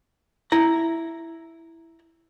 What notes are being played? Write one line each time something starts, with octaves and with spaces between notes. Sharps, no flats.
E4 A#5